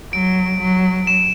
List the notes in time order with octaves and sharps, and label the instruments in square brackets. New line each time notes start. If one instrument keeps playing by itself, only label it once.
[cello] F#3 [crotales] D7
[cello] F#3
[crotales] E7